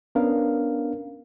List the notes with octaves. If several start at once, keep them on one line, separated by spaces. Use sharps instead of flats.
B3 C#4 D4 A#4 F5